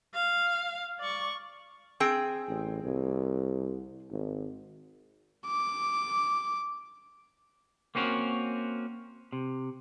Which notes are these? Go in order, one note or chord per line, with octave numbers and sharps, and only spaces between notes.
F5
D5 C#6
C4 G#4 G5
A1
C2
G#1
D6
A#3 C4 C#4 F#4 A#4
C3